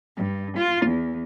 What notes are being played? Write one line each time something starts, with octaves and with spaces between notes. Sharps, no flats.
G2
F4
E2